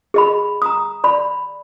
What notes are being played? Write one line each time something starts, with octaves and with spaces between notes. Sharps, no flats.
G#4 D#5 B5
A#5 D#6
D5 B5